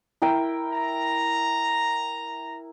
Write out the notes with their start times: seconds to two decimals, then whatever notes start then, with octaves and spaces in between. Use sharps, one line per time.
0.22 E4 A#4 G5
0.73 A#5